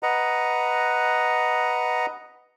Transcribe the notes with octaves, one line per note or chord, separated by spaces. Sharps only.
B4 D#5 F#5 A#5